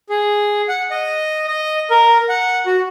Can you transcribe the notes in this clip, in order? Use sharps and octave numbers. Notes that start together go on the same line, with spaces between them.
G#4
F#5
D#5
D#5
A#4
F#5
F#4